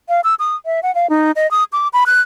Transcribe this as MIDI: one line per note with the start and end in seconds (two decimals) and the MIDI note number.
0.09 0.21 77
0.24 0.35 88
0.39 0.56 87
0.66 0.80 76
0.83 0.93 78
0.95 1.09 77
1.10 1.32 63
1.36 1.49 75
1.51 1.64 87
1.73 1.88 86
1.93 2.04 83
2.06 2.21 90